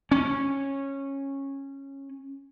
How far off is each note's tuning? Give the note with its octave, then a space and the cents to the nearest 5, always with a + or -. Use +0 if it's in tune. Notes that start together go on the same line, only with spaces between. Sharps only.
C#4 -15